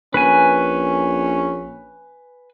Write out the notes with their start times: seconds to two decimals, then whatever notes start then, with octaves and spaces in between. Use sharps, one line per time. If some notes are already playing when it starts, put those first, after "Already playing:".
0.14 A#1 C#4 B4 G#5